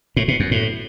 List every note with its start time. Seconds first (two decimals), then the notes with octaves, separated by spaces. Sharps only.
0.16 A2
0.28 B2
0.40 F#2
0.51 A2